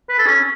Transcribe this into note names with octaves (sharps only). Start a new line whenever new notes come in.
B4
A4
C#4